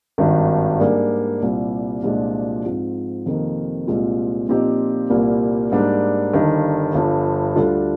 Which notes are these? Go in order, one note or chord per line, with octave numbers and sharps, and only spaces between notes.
G#1 G2 D#3
G#2 G3 A#3 D4 G#4
C2 A#2 G3
C2 A#2 F3 G#3 D4
G#2 F3 C4
F2 C3 D#3 A#3
C2 A#2 G#3 C4 F4
A#2 F3 C4 D#4 G4
C2 A#2 G3 A#3
G#2 G3 A#3 D4
G1 G2 D#3
G1 G2 F3
D2 D3 G3 D4 F4